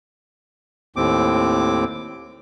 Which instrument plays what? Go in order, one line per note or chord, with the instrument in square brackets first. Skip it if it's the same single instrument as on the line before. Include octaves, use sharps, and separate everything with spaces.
[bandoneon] D#2 A2 C4 D6